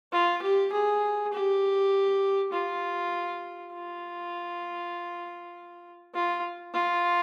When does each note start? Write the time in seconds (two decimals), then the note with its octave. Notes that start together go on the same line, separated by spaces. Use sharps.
0.12 F4
0.42 G4
0.72 G#4
1.33 G4
2.53 F4
3.73 F4
6.14 F4
6.73 F4